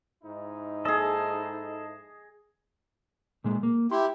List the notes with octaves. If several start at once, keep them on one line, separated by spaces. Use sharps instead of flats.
G#2 D#4 E4
G#4 A4 D#5
A#2 G#3
A#3
E4 G4 C6